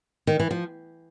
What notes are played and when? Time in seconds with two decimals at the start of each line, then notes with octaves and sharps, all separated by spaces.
0.27 D#3
0.40 E3
0.51 F3